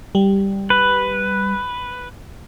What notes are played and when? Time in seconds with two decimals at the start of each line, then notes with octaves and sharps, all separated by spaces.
0.15 G3
0.70 B4